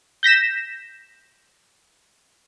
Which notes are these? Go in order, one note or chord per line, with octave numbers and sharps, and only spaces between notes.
G6 A#6 B6 E7